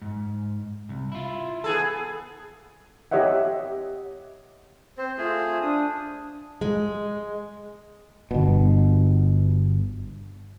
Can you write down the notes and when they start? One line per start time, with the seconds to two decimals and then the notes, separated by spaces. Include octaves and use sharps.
0.02 G#2
0.89 C2
1.12 E4 F4
1.64 B3 G#4 A4
3.11 G4 C#5 D#5 E5 F#5
4.98 C4 C5
5.18 A3 F4 G#4
5.62 D4 D#6
6.61 G#3
8.31 G1 B2